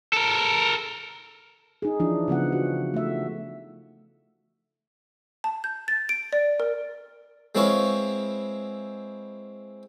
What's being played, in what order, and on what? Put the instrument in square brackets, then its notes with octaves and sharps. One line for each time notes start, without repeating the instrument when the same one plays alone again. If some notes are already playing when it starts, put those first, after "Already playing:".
[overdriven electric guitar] A4 A#4
[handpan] D#4 G#4
E3 F3 D4 E4
C#3 F3 B3 F#5
F#4
A3 E5
[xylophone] A5
G6
A6
D7
D5
A#4
[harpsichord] G#3 C4 E4 B4 C#5 F5